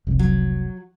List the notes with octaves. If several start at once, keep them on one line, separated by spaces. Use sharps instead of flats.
F1 C2
F#3